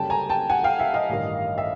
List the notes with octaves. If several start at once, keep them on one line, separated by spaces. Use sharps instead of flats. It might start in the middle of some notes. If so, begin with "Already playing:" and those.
Already playing: F#1 F#2 D3 G3 G5 A5
G#5 A#5
G5 A5
F#5 G#5
F5 G5
E5 F#5
D#5 F5
A1 G2 D#3
E5